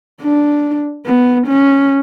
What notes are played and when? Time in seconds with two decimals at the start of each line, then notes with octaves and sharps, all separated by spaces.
0.22 D4
1.06 B3
1.47 C#4